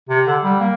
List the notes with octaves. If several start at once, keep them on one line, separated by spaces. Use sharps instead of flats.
C3
D3
G3
A#3